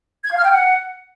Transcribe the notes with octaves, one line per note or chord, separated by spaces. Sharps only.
G#6
F5
F6
G5
F#5